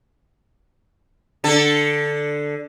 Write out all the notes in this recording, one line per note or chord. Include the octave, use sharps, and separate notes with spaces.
D3 A4